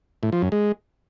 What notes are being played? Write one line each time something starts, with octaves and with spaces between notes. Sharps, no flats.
A2
F3
F#2
G#3